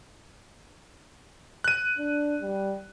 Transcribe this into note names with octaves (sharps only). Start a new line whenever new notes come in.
F#6 D#7
D4
G3